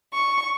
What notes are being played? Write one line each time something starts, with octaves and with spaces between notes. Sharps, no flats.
C#6